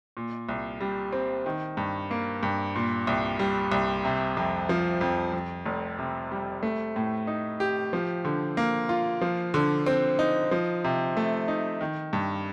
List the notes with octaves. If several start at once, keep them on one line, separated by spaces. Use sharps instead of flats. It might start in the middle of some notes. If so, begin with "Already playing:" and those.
A#2
C2
G3
C4
D#3
G2
A#3
G2
A#2
C2
G3
C2
C3
F2
F3
F2
F2
F1
C3
G3
A3
A2
D#4
G4
F3
D3
A#3
F4
F3
D3
C4
D#4
F3
C3
A3
D#4
D#3
G2